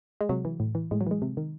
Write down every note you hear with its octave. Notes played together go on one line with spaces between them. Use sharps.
G#3
C3 F#3
E3
A2
E3
A2 G#3
F#3
E3 G#3
C3
D#3